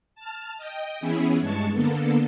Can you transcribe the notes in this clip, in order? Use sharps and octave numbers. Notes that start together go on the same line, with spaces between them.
A5 F6
D#5 G5
E3 B3 C#4 E4 G#4
G2 G#3 A5 C#6
D3 A#3 B3 A4